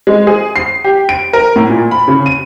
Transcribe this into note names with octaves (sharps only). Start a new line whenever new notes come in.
G#3
G#4
C7
G4
D7
A#4
A2
A#2
B5
C#3
D#7